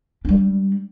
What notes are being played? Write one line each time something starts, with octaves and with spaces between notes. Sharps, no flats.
G3 D4